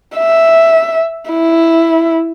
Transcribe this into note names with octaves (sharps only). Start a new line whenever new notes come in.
E5
E4